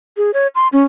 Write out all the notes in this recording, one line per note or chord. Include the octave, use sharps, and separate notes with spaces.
G#4
C#5
C6
C#4